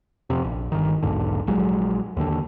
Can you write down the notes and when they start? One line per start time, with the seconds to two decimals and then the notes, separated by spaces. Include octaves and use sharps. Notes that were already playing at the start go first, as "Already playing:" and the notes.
0.30 F2 C3
0.44 A#1
0.72 G1 D#3
1.03 B1 E2 G#2 D3
1.47 A#1 F#3 G#3
2.17 D#2 D3